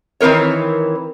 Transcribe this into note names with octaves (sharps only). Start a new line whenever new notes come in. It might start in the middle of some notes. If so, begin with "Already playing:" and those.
D#3 E3 C4 A#4 C#5